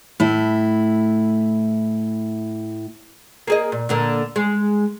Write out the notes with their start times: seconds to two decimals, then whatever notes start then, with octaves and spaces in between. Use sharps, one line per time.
0.20 A2 E4
3.47 A#3 G#4 D#5
3.72 A#2
3.89 A#2 D3 A#3
4.36 G#3